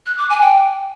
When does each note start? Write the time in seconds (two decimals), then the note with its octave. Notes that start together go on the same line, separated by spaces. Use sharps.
0.06 F#6
0.18 D6
0.30 G#5
0.42 G5